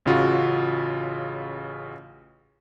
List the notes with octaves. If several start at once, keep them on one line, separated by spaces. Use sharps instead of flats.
A1 C#3 F4 F#4